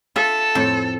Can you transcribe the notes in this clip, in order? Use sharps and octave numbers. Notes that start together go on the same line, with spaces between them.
F4 A4 E5
F2 A2 C4